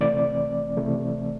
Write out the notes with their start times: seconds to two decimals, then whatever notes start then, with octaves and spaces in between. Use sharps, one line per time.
0.01 C3 E3 A3 C4 D5
0.77 C3 E3 A3 C4